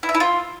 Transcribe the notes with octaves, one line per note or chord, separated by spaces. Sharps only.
E4
E5
E4
F4